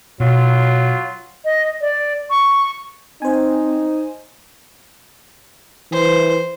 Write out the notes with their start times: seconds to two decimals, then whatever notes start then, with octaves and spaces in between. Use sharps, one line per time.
0.20 B2 F#3 F4
1.45 D#5
1.81 D5
2.30 C#6
3.22 C4 D#4 C5 G#5
5.92 E3 C5